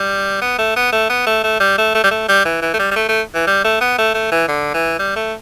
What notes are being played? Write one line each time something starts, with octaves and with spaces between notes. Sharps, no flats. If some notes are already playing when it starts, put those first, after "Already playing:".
Already playing: G3
B3
A3
B3
A3
B3
A3
A3
G3
A3
A3
G3
A3
G3
E3
E3
A3
G3
G3
A3
A3
E3
G3
A3
B3
A3
A3
E3
D3
E3
G3
A3